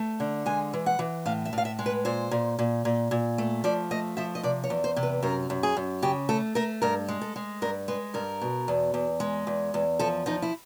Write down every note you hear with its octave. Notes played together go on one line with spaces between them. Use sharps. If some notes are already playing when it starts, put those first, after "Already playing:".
Already playing: A3
D3
G#3 G#5
E3
F#5
E3
A2 F5
E5
A2 F5
E5
G#3
B4
A#2 C5
A#2
A#2
A#2
A#2
A3
F3 D5
A3 D#5
F3 E5
D#5
C3 D5
C#5
E2
C5
C3
B4
F#2 A#4
F#2
G#4
F#2
C#3 G4
A3 A4
A3 A#4
G2 A#4
G#3
A4
G#3
G2 A#4
G#3 B4
G2 A#4
B2
E2
E2
G#3
E2
E2
F3 A4
F3 D#4
E4